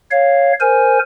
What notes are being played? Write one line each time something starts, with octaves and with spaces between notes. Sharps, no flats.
C#5 F5
A#4 C5 G#5